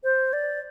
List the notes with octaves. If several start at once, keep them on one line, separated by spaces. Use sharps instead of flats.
C5
D5